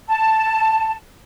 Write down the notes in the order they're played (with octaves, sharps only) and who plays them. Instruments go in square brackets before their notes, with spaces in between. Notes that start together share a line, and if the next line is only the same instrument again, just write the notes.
[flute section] A5